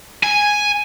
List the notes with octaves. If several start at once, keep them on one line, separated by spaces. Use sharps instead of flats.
G#5